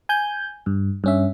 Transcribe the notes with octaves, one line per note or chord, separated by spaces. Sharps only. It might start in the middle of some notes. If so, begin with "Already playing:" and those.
G#5 G6
G2
G2 C#4 E5